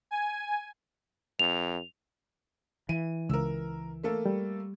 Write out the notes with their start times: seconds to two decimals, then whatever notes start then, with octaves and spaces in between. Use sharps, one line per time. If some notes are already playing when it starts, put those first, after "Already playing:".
0.11 G#5
1.39 F2 F7
2.89 E3 D#7
3.29 C#2 A#4 E6
4.03 A3 A#3 A4
4.26 G3